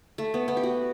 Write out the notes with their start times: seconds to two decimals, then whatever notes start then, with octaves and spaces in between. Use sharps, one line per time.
0.18 A3
0.34 B3
0.48 B3
0.57 G4
0.63 F#4